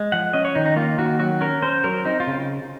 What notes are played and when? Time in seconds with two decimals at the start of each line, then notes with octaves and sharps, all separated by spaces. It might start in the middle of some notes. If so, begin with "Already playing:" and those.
Already playing: G#3
0.12 F3 F#5
0.33 C#4 D#5
0.45 C#5
0.55 D#3 D#4
0.66 D#4
0.76 A#3 F4
0.98 D#3 F#4
1.19 F#3 F#4
1.41 C#4 A#4
1.62 C#4 C5
1.84 F#3 A#4
2.05 C4 D#4
2.20 F4
2.27 C#3